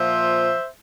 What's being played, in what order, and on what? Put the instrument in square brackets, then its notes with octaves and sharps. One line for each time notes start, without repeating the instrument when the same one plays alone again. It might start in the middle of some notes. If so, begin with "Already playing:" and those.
Already playing: [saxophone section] A#2 F3 C5 E5